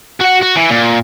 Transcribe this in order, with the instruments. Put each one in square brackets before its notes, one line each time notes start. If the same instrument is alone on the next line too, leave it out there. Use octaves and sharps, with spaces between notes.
[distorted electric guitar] F#4 F#5
F#4
E3
A#2